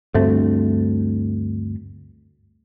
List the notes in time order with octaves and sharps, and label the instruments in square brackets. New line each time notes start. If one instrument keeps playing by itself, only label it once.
[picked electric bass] D2 G2 A3 C4